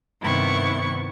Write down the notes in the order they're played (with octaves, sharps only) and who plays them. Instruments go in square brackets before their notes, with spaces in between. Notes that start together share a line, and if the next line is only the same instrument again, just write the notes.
[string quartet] G2 C3 D#3 B3 E4 C#6